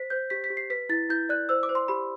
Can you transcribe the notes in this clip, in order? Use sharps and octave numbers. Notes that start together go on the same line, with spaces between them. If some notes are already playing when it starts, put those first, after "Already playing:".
Already playing: C5 B6
C5 G6
G4 B6
B6
G4
C7
B4 B6
E4 A6
E4 G6
D5 F#6
C5 E6
D6
C5
C6
G4 B5